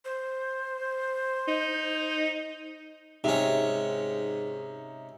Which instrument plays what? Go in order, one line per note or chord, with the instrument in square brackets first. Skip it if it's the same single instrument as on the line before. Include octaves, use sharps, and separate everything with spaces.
[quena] C5
[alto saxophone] D#4
[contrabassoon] G#2 [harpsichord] C3 C#4 [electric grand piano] D#4 E5